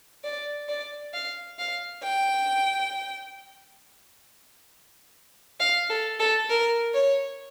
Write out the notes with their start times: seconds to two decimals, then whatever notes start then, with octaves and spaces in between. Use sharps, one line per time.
0.24 D5
0.69 D5
1.13 F5
1.59 F5
2.03 G5
5.60 F5
5.90 A4
6.20 A4
6.49 A#4
6.94 C#5